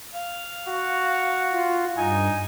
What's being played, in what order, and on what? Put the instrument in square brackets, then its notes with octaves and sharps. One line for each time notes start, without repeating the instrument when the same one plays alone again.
[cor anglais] F5
[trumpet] F#4
[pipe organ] F4
[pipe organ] G2 [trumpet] D#4 [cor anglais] G#5